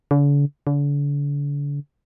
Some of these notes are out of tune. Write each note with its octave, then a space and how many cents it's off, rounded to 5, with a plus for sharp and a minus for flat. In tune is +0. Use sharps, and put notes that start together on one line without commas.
D3 -45
D3 -40